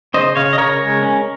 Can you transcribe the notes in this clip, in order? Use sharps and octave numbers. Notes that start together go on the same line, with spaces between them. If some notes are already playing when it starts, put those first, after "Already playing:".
C#3 C5 D#5
C#3 C#5 F5
D#5
C#3 A#4 C#5
G#3
C#4